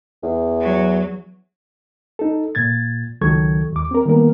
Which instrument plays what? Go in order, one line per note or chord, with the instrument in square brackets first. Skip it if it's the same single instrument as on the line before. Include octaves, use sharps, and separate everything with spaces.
[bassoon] E2
[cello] F#3
[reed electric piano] D#4 A4
A#2 G#6 A6
C#2 D#3 F#3 A4 C#6 G#6
D#2 D6
C4 A#4
D#3 G3 A#3 B3 A#4